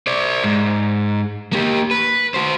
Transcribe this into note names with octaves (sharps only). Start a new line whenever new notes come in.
C5 D5
G#2
A#3 G4
B4
F#4 C5